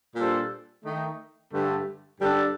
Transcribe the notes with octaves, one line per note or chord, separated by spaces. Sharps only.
A#2 G3 D4 A4 C5
D#3 A3 D#4
G2 D3 A3
G2 D3 G3 D4 A4